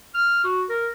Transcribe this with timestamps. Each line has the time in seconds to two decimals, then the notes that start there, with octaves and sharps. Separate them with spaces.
0.15 F6
0.44 F#4
0.69 A#4